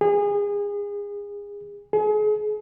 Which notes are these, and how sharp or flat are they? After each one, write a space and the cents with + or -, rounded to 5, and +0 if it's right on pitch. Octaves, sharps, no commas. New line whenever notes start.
G#4 -30
G#4 +35